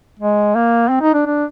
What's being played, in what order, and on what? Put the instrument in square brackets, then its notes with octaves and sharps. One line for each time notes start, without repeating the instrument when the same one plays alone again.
[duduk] G#3
A#3
C4
D#4
D4
D4